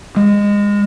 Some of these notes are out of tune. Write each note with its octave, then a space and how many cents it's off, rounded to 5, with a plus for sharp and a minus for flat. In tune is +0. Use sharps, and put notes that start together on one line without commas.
G#3 -25